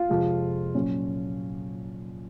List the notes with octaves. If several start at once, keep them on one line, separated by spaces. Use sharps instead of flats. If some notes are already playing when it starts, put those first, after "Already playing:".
Already playing: F4
F2 C3 F3 G#3
A#2 F#3 C#4